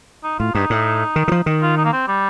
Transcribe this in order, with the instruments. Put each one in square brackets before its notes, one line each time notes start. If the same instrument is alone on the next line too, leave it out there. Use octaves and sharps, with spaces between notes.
[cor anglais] D#4
[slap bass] A2 [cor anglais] F4
[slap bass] G2 [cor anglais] D#4
[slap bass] A2
D#3
D#3
F3
D#3
[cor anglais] F4
D#4
A#3
C4
G3